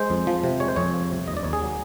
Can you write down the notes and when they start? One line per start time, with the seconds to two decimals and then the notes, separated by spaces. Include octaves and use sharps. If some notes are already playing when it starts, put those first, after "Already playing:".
Already playing: G#3 C5
0.10 F2
0.27 F3
0.44 C3
0.60 G#3 C#5
0.68 C5
0.76 F2 C#5
0.94 F3
1.11 C3
1.27 D#2 D#5
1.37 D5
1.44 D#2 C#5
1.53 G#4
1.62 F#3